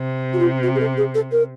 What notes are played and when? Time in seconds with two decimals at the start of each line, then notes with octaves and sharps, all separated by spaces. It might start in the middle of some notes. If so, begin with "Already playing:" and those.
Already playing: C3
0.33 F#4
0.39 F4
0.63 F#4
0.75 G#4
0.80 A4
0.97 G#4
1.15 A4
1.32 A#4